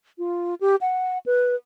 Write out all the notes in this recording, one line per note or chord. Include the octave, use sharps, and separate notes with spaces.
F4
G4
F#5
B4